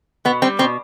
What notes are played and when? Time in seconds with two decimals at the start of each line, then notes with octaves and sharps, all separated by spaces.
0.25 B2 B3
0.42 G3 C4
0.59 B2 C4